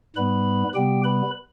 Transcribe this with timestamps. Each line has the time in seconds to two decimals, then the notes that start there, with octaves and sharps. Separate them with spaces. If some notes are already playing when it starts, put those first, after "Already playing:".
0.16 G#2 G3 B3 B4 B5
0.75 C3 G3 B3 G4 G5
1.04 B4 B5